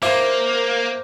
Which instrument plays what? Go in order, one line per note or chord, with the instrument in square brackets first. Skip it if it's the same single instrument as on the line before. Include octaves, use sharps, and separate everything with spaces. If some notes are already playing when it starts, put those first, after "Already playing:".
[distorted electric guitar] A#3 [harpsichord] E4 F4 [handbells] C5 D6